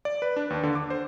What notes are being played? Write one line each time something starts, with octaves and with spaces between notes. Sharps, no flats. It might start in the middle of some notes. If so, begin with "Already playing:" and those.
D5
B4
D4
D#2
D3
D6
C5